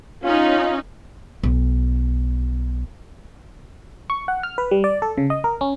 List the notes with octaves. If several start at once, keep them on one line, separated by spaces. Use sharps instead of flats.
C#4 D#4 F4
B1
C#6
F#5
F6
B4
G3
D5
A4
C#3
D#5
A#4
C#4